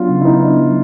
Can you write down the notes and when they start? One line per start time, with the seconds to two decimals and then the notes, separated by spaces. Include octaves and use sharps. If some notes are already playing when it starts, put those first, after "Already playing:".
Already playing: F#3 B3 D4 F4
0.08 C#3
0.21 E4
0.25 B3 D#4
0.42 D4
0.59 F#3